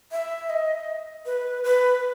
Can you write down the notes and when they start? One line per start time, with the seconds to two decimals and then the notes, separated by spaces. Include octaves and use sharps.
0.12 E5
0.49 D#5
1.26 B4
1.64 B4